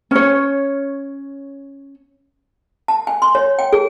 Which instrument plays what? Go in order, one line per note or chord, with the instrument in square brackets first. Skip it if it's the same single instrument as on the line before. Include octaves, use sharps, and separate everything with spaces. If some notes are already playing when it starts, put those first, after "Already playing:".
[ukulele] C#4 C#5
[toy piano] A5
G#5
C6
C#5
G5
G#4